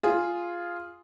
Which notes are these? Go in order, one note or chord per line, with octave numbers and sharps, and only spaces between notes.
F4 G#4